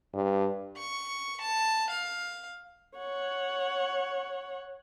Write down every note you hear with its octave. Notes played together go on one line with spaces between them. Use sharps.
G2
C#6
A5
F5
C#5 F#5